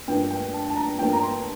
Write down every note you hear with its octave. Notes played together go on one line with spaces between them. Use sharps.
G2 F3 A#3 G5
G5
A5
A5
A#5
G2 F3 A#3 G5
A#5
C6